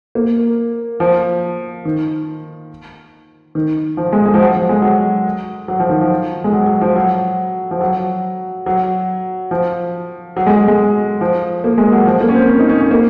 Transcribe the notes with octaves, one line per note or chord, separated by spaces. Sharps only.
A#3
F3
D#3
D#3
F3
G#3
G#3
F3
F#3
F3
G#3
F#3
F#3
F3
D#3
F3
G#3
F#3
F#3
F3
F#3
F3
F#3
F#3
F3
F#3
G#3
G#3
G#3
F3
A#3
G#3
F#3
F3
A#3
C#4
C4
C#4
D#4
C#4
C#4
A#3